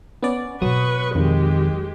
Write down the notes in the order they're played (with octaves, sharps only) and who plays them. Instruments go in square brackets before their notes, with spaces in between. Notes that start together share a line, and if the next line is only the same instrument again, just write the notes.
[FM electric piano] B3 C#4 D5
[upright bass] B2 C4 [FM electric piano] F#3 D#6 [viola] B4 C#6
[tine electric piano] F2 D#3 [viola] G#3 G4